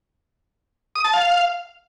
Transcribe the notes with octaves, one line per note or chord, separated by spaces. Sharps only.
D#6
A5
F5